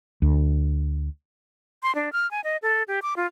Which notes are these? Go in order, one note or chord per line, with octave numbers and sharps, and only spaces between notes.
D2
C6
D4
F6
G#5
D#5
A4
G4
D6
F4